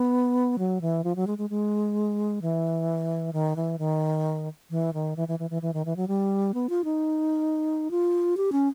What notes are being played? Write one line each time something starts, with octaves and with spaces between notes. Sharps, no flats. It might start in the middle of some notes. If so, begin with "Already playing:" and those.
Already playing: B3
F#3
E3
F3
F#3
G#3
G#3
G#3
E3
D#3
E3
D#3
E3
D#3
E3
E3
E3
E3
E3
D#3
E3
F#3
G3
B3
F4
D#4
F4
G4
C#4